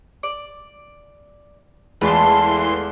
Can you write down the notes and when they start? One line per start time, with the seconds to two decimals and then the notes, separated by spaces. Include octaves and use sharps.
0.23 D5
2.01 E2 E3 G#3 A3 F4 A5 B5 C6